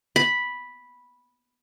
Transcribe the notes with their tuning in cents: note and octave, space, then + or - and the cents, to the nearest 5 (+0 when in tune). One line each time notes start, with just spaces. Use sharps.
B5 -5